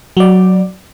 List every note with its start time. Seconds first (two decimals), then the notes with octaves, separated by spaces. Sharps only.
0.17 F#3 D5